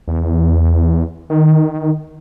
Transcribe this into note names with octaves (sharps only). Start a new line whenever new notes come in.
E2
D#3